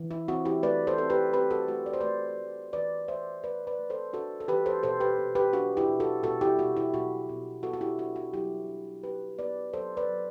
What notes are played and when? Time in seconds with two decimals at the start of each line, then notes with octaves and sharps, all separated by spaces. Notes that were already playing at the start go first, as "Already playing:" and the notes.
Already playing: E3
0.11 E4
0.28 C4 F#4
0.45 E4 G4
0.63 A3 B4 D5
0.87 A4 C5
0.98 C4 A4
1.10 G4 B4
1.33 C4 G4 B4
1.50 F#4 A4
1.68 A3 F#4
1.86 D5
1.93 C5
2.00 A3 B4 D5
2.38 A3
2.73 E3 B4 D5
3.08 A3 C5 E5
3.43 A3 B4 D5
3.67 B4 D5
3.79 A3
3.90 A4 C5
4.13 D4 F#4 A4
4.40 A4
4.48 E3 G4 B4
4.66 A4 C5
4.83 B2 A4 C5
5.00 G4 B4
5.19 B2
5.35 G4 B4
5.53 D4 F#4
5.77 E4 G4
5.88 B2
6.00 F#4 A4
6.23 B2 F#4 A4
6.41 E4 G4
6.58 B2 F#4
6.77 E4
6.93 B2 F#4
7.29 B2
7.63 B3 F#4 A4
7.73 F#4
7.81 E4 G4
7.98 D4 F#4
8.16 F#4
8.33 F#3 E4 G4
8.68 D4
9.03 B3 G4 B4
9.39 B3 B4 D5
9.73 F#3 A4 C5
9.97 B4 D5
10.09 F#3